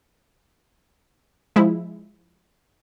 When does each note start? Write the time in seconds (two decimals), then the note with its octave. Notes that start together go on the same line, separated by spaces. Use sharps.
1.56 F3 G#3 E4